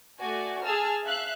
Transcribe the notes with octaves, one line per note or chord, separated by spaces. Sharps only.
A3 F#4 D5 G#5
G#4 G#5 A5 E6 F6
E5 F5 F#6